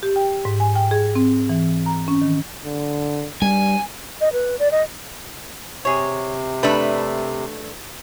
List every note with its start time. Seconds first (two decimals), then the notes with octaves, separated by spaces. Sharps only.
0.03 G4
0.16 G5
0.45 G#2
0.60 G#5
0.75 G5
0.91 G#4
1.15 C4
1.49 E3
1.86 A#5
2.08 C#4
2.21 D#3
2.65 D3
3.42 G2 G3 G#5
4.21 D#5
4.33 B4
4.59 D5
4.72 D#5
5.85 C3 G#4 C#5
6.63 G3 A3 D4 B4